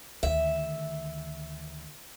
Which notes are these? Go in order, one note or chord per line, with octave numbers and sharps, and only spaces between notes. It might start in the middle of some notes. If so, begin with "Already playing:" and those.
D2 D#3 E5